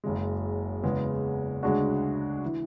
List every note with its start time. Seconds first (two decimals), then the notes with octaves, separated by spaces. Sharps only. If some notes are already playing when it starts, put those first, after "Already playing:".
0.04 F#1 F#2 C#3 G#3
0.84 E2 C#3 G#3 B3
1.63 D2 C#3 G#3 D4 F#4
2.46 E3